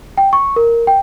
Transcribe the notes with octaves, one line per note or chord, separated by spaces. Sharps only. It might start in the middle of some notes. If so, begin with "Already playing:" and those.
G5
C#6
A#4
G5